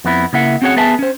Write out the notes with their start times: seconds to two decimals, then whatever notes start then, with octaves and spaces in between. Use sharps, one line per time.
0.05 F2 B3 E4
0.33 C#3 A#3 E4 E5 F#5
0.62 C4 C#4 F#4 G#4 C#5 F#5
0.77 B3 G#4 B4 E5 G#5 A5
0.99 C#4 C5